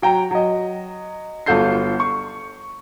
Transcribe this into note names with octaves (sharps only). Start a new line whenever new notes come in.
F#3 G5 A#5
F#3 D#5
G1 F4 F#4 A4 G6 C7
C#6